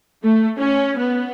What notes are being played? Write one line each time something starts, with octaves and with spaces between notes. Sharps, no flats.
A3
C#4
B3